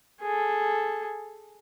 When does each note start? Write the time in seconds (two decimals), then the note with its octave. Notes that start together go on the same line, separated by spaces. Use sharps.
0.22 G#4 A4